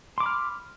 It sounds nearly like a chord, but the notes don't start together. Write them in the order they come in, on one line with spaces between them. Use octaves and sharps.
C6 D6 B5 F6